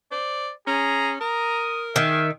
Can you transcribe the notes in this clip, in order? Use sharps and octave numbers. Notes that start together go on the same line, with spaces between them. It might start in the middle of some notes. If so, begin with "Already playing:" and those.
C5 D5
C#4 G#4 A#5
A#4 A#5 D#6
D#3 G#4 E5